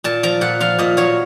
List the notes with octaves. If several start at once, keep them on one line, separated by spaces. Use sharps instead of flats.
A#2 A5
F3 A#5
A#2 F#5
F3 F5
A#2 D#5
F#3 C#5